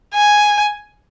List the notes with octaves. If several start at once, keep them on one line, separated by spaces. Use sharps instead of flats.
G#5